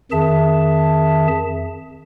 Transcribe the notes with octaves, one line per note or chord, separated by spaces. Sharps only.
F2 D#3 G#4 E5 A5